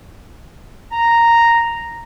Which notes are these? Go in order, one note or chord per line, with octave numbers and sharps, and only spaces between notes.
A#5